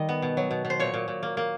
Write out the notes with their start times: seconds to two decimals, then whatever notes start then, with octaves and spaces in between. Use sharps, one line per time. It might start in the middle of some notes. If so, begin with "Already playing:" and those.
Already playing: D#3 G3 D#5
0.09 B3
0.22 B2
0.37 F#3
0.51 B2
0.65 B2
0.70 C5
0.80 A#2 C#5
0.94 A#2
1.08 A#2
1.23 A#3
1.37 A#3